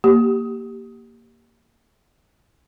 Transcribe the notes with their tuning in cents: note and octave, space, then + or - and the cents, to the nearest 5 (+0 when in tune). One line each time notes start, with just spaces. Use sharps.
A#3 +0 G4 +0